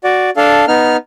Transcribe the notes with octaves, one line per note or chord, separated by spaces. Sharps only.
F#4 D5
D4 A4 F5
B3 D#4 F6